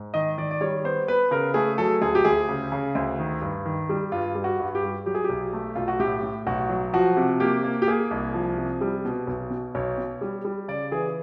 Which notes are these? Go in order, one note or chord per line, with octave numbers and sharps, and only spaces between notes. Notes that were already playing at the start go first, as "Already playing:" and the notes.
Already playing: G#2
D#3 D#5
D#3 D5
D5
G3 C#5
B3 C5
B3 B4
C#3 A#4
A3 G#4
F#3 A4
D2 G#4
G4
D2 G#4
C#3
C#3
D2
D#3
G2
D#3
G3
G2 F4
G3
F#4
G2
G4
G3
F#3 G4
G#4
G4
B1
A3
B1 F4
F#4
A2 G4
A2
B1 F#4
F#3
F3 F#4
C3
A#3 G4
A#3
G4
A#3 G#4
C2
F3
C3
G3
B2
B1
B2
B1 C#5
B2
G3
G3
C#3 D5
E3 G#4